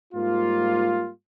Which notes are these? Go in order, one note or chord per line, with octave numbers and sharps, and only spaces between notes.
G#2 G3 A#3 F4